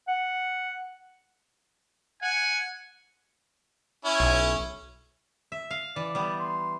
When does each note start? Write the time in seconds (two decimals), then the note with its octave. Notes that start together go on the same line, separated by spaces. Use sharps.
0.08 F#5
2.22 F#5 G#5
4.05 C#4 E4
4.20 B1
5.52 E5
5.71 F5
5.96 E3 D5
6.15 G3 B3
6.40 C6